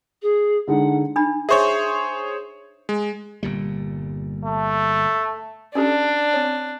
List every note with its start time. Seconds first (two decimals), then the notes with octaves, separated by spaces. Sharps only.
0.22 G#4
0.68 D3 G#3 D#4 F#5
1.16 D4 D#4 B5
1.49 G#4 C5 C#5 E5 C#6
2.89 G#3
3.43 G1 A#2 G3
4.45 A3
5.75 C#4 D4 G4 A4
6.33 C4 C#5